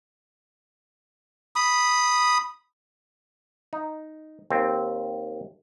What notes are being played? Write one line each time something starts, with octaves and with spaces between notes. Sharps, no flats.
B5 D#6
D#4
D#2 C4